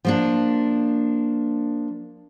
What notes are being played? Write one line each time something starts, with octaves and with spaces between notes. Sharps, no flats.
F3 A#3 D4